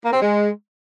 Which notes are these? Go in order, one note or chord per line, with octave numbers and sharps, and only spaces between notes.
A#3
C4
G#3